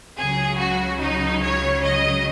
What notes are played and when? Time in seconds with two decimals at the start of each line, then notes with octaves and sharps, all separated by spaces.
0.17 C#2 C#3 F#3 G#4
0.58 F#4
1.00 D#4
1.43 C#5
1.84 D#5